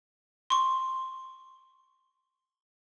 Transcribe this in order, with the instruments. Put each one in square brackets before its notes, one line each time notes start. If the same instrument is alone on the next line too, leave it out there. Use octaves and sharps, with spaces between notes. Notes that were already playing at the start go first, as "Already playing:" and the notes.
[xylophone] C6 C#6